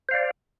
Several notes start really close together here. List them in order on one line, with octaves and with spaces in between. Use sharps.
C5 F5 D5